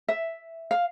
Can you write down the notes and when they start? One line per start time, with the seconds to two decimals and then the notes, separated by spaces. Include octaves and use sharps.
0.08 E5
0.71 F5